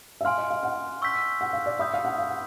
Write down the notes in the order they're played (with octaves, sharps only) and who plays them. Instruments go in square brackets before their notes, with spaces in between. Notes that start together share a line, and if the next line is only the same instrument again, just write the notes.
[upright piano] E5
[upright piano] F5 [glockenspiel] G#5 C6 F6
[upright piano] D#5
F5
F#5
[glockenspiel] C#6 E6 G6 B6
[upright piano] F#5
F5
D5
[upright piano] E5 [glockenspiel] B5 D#6 G6
[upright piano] F5
F#5
F5
F#5